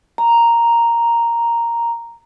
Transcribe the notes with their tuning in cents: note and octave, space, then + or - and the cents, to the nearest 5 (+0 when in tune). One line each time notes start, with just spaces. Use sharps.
A#5 +0